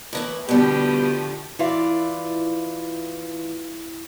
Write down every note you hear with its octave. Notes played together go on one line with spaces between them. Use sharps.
A2 E3 E4
B2 D3 F3 G3 A3 G4
E3 E4 F4 D5